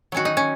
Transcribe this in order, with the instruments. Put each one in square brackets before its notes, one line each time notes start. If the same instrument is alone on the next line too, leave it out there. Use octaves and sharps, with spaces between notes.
[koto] D#3 F#3 C#4 F#4
D#4
C#4